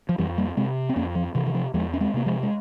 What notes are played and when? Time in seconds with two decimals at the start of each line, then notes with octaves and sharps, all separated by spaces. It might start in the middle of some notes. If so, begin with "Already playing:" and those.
0.09 F3
0.18 F2 E3 G3
0.38 G3 A#3
0.57 C3 G#3 C4
0.89 C4
0.96 F2 A#3 C#4
1.15 F3
1.35 C3 E3
1.47 E3
1.54 F3
1.74 E2 F3 G#3
1.93 C#4
2.01 G#3 C4
2.14 C3 A#3
2.26 F3 G#3
2.43 G#3